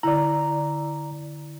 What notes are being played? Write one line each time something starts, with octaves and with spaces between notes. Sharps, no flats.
D3 E4 D5 A#5